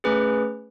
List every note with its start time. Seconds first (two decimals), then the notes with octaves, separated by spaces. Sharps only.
0.04 A3 C#4 G#4 B4